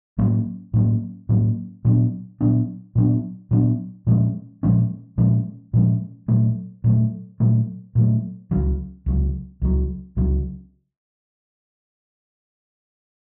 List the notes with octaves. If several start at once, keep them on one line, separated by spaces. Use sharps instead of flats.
A2 F#3 A#3 C#4
A2 F#3 A#3 C#4
A2 F#3 A#3 C#4
A#2 F#3 B3 D4
A#2 F#3 B3 D4
A#2 F#3 B3 D4
A#2 F#3 B3 D4
A#2 F3 G#3 C#4
A#2 F3 G#3 C#4
A#2 F3 G#3 C#4
A#2 F3 G#3 C#4
A#2 F#3 A3
A#2 F#3 A3
A#2 F#3 A3
A#2 F#3 A3
C#2 C#3 F#3
C#2 C#3 F#3
C#2 C#3 F#3
C#2 C#3 F#3